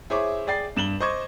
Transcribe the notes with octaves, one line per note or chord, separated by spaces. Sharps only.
E4 G#4 C5 C#5 E5 D6
G#4 D5 G5 A6 C7
G2 E7 F#7 G7
C5 D#5 C#6 D6 G#6